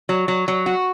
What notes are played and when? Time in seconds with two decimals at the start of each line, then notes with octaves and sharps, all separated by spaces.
0.09 F#3
0.28 F#3
0.48 F#3
0.66 F#4